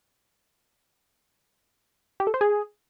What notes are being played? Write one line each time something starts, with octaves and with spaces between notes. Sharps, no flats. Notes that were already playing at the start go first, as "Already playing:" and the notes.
G4
A4
C5
G#4